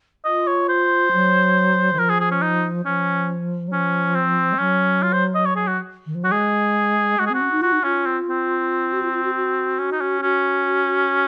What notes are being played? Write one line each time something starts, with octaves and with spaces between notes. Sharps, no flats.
F4 D#5
C#5
C5
F#3
D#3
F3 A#4
G#4
G#4
C#4
D#4
F3 C#4
F#3
F3 C#4
C4
G#3
F#3 C#4
F4
C5
D#5
C#5
G#4
F#4
D#3
F3
F#3 F#4
G#3 G#4
G#3 F#4
G#4
C4 F#4
C#4
D#4
F4 F#4
D#4
C#4 F4
C4
C4
F#4
F4
F4
F#4
F#4
C#4
D#4
C#4
C#4 F#4